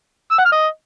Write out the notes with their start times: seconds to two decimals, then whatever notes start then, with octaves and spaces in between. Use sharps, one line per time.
0.32 E6
0.38 F#5
0.45 F6
0.52 D#5